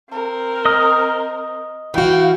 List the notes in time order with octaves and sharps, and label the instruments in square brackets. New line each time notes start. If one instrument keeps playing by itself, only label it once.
[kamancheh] C4 A#4
[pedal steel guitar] D#5 D#6 F6
[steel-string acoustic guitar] E3 F#4 [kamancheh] F5 G5